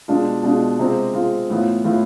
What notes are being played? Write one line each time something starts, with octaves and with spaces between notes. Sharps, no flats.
B2 G#3 D4 F4
B2 G#3 D4 F4
C3 G#3 C4 F4
C3 G#3 C4 F4
A2 E3 B3 F4
A2 E3 B3 F4